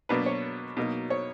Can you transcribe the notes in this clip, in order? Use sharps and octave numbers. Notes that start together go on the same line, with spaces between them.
B2 F#3 A#3 D4 B4
C#5
B2 F#3 A#3 D#4
C#5